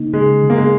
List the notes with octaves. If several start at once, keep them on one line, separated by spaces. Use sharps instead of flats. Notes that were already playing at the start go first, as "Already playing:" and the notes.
Already playing: C#3 A#3 D#4
C#3 G#3
C#3
A#3
G#3